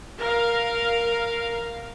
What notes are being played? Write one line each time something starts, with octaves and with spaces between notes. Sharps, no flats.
A#4 F5